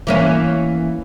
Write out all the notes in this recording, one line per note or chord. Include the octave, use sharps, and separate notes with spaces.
E3 A#3 C#4